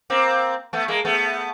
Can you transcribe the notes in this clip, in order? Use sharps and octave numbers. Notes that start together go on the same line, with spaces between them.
A#3 C4
A3 B3
G#3 A#3
A3 B3